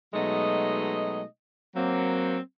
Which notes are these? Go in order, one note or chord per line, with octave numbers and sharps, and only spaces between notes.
B2 F#3 G#3 A3 D#4 D#5
F#3 A#3 C4